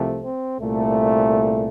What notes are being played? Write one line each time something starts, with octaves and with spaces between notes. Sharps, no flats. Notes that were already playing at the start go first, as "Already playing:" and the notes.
Already playing: C2 C3 F3 A3
C4
C2 A#2 A3